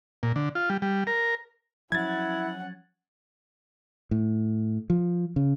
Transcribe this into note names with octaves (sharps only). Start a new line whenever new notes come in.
A#2
D3
F4
G3
G3
A#4
F3 F#3 C#4 E4 F#5 G#6 A6
A2
F3
C#3